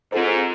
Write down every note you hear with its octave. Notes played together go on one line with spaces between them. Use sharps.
G#2 C4 F4 A4 C5